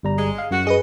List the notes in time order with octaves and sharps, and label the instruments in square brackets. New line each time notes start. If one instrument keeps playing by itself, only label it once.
[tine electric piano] G1 G3 A#5
[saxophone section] G#3
[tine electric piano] F5
[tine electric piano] F#2 [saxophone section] F#4
[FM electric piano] G#4 B4 [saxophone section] D#5